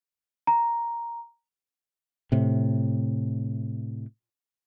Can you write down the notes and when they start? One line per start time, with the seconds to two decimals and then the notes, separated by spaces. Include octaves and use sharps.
0.47 A#5
2.32 A2 C3